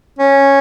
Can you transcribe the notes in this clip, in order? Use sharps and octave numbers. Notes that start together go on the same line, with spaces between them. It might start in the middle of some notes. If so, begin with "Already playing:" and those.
C#4